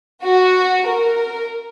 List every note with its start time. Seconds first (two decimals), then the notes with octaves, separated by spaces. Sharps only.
0.24 F#4
0.88 A#4